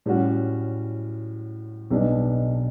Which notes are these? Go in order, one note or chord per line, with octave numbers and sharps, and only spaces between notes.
A2 G3 C#4 F#4
B1 B2 G3 D4